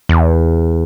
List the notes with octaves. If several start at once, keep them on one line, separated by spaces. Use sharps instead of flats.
E2